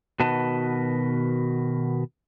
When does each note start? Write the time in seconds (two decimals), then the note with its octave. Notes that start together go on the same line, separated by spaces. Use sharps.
0.20 B2 D#3 F#4 B4 D#5 A5